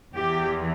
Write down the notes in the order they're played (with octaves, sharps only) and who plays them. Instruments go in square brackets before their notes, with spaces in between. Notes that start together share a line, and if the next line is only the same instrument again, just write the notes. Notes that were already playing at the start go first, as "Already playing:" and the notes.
[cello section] E2 E3 G4